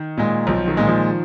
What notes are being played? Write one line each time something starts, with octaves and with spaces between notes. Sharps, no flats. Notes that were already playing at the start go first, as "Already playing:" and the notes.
Already playing: D#3
A#2 G#3
B1 F3
D#3
A#2 G#3
F3